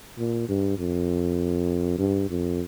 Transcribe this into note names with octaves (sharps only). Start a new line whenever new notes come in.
A#2
G2
F2
G2
F2